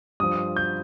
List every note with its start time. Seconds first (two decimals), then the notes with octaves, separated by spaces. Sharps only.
0.20 G2 F3 D#6
0.56 G6